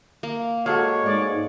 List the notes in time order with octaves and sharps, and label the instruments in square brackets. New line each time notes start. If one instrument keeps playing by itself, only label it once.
[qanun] A#3
[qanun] G#3 [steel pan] F#4 A4 F5 [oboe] C#5
[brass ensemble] G#2 [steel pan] D5